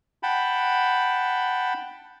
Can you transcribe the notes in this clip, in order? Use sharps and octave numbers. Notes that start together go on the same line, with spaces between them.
F#5 G5 A5 B5